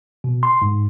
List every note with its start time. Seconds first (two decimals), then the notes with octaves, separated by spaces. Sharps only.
0.24 B2
0.43 C6
0.62 G#2